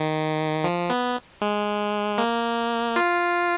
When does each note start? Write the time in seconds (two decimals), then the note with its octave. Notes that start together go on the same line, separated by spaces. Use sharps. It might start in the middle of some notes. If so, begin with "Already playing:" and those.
Already playing: D#3
0.64 F3
0.90 B3
1.42 G#3
2.18 A#3
2.96 F4